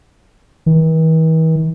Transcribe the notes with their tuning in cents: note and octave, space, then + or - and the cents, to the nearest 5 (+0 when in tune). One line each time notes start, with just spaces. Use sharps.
E3 -45